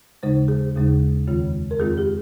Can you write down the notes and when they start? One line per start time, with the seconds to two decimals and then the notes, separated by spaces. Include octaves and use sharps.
0.23 D#2 C#3 G#3 D#4 C5
0.48 G#4
0.75 D#2 C#3 G#3 D#4
1.27 F2 D#3 G#3 C4 F4
1.71 A#4
1.79 F2 D#3 G#3 C4 F4 G#4
1.98 G4